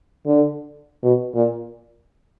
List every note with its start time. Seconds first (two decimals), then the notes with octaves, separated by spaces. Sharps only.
0.26 D3
1.03 B2
1.34 A#2